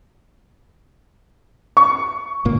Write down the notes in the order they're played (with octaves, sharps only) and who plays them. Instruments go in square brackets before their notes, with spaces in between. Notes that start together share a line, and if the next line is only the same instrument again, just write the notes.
[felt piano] C#6
[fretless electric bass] G1 A#2 A#3